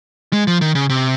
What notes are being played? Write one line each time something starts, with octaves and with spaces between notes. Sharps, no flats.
G#3
F3
D#3
C#3
C3